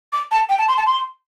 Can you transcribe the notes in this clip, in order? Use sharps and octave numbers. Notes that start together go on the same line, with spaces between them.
D6
A5
G5
A5
C6
A5
C6